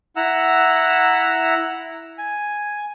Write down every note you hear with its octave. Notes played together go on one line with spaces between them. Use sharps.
E4 F#5 A#5 E6
G#5